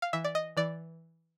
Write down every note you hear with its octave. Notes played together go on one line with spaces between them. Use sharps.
F5
E3 E5
D5
D#5
E3 D5